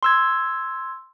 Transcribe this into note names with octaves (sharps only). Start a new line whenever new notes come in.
C6 E6 G#6